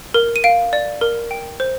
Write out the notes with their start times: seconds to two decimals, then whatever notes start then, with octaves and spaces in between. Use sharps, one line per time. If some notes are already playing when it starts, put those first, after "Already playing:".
0.14 A#4
0.36 D#7
0.44 F5 D7
0.73 D5
1.01 A#4
1.31 G5
1.60 C5